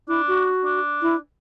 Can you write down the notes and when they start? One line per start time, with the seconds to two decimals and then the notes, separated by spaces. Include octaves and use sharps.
0.08 D4 E4
0.28 F#4
0.65 D4
1.02 E4